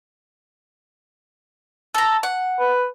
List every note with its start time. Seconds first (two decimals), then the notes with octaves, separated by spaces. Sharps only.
1.94 A4 A#5
2.23 F#5
2.59 B4